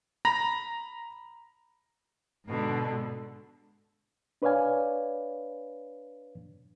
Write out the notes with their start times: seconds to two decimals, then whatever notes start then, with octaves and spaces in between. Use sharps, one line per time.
0.25 A#5 B5 A#6
2.45 G#2 B2 D3
4.42 D4 B4 C#5 D5 F5 G#5